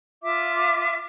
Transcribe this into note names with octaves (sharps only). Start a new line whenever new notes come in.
F4 E5 D6